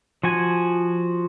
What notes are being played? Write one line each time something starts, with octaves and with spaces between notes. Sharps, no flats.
F3 F#4 G#5